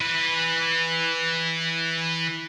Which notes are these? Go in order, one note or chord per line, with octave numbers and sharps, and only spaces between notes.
E3 B4